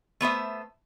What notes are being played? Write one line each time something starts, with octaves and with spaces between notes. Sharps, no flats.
A3 B3 C5 E5